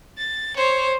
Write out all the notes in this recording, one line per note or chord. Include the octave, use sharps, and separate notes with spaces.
A6
C5 C#5